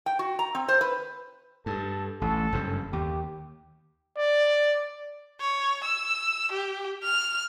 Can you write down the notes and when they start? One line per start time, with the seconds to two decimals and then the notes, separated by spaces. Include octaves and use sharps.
0.06 G5
0.19 F#4
0.39 A#5
0.55 C4
0.68 C5
0.81 B4
1.66 G2 A4
2.21 A1 A4
2.52 F#1 G2 C#3
2.93 D#2 G4
4.17 D5
5.40 C#5
5.84 E6
6.52 G4
7.03 F6